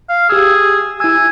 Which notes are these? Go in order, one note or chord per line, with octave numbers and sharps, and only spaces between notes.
F5
G4 G#4 E6
E4 G#5 E6